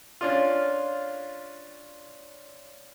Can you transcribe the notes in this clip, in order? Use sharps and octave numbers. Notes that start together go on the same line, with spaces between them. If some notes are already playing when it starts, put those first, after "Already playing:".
C#4 D4 F4